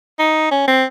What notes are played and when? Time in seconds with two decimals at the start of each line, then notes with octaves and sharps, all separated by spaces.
0.19 D#4
0.51 C#4
0.68 C4